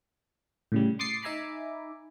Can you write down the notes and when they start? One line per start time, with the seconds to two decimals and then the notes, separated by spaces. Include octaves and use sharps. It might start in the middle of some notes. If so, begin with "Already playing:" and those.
0.72 A2 C#3 G3
0.99 C6 D6 D#6 A6 C7 C#7
1.22 D#4 E5 G#5 A#5 B5 D6